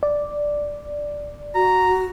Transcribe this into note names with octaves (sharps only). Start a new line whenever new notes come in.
D5
F#4 A#5